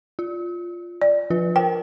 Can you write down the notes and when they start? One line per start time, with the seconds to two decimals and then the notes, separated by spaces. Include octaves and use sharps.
0.19 F4
1.02 D5
1.30 F3 F4 B4
1.56 A#4 C5 G5